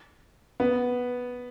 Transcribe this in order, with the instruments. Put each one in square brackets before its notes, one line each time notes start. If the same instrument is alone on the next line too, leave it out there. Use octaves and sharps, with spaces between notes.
[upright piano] B3